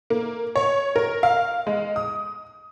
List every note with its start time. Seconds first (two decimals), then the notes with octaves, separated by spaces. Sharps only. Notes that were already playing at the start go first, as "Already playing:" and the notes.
0.10 A#3
0.56 C#5
0.96 A#4
1.23 F5
1.67 G#3
1.96 D#6